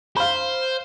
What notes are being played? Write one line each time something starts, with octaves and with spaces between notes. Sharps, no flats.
C5 F5 B5